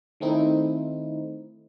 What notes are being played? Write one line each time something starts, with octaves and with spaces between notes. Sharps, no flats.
D#3 A3 C4 D#4 E4